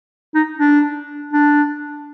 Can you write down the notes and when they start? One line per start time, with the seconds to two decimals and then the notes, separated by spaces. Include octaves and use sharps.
0.35 D#4
0.59 D4
1.33 D4